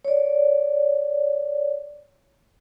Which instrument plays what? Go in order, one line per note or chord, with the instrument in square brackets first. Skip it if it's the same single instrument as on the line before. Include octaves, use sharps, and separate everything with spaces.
[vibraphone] C#5 D5